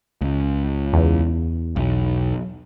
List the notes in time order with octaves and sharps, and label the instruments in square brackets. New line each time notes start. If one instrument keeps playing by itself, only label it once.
[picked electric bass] C#2
[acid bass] E2
[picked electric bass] B1